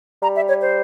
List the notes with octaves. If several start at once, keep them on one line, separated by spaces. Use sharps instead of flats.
G3 A#5
E5
C#5
C5